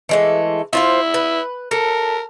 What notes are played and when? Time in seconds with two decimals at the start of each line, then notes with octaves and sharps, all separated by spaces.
0.09 E3 G#3 A3
0.73 E4 F4 C5 F5
1.14 B4
1.71 A4 A#4